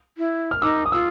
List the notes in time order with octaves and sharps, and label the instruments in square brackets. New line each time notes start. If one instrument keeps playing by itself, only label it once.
[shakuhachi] E4
[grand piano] F6
[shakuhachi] D#4 [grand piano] D6 E6
[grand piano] D#6
[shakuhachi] F4 [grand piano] E6